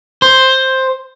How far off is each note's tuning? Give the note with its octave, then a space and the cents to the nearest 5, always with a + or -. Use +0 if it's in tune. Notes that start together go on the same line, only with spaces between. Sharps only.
C5 +5